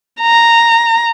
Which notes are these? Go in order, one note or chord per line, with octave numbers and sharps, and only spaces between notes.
A#5